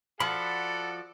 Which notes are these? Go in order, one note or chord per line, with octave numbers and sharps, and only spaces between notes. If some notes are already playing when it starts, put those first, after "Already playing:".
F3 F#4 A4 D5 F#5 B5